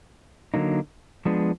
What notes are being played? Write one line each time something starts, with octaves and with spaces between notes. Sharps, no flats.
D3 F#3 A#3 D#4
F3 G#3 B3 D4